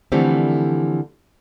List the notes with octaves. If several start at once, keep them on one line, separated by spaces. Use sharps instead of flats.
D3 E3 F3 G3 A3 C4